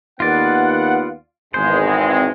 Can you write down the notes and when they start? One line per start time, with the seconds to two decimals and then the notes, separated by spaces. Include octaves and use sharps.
0.20 D#2 B3 F4 D5 F#5
1.54 G#1 E2 G#3 C5
1.87 C4